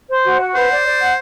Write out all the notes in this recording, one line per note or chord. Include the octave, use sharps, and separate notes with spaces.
C5
F#4
F#5
B4 C5
D5
D5
F#5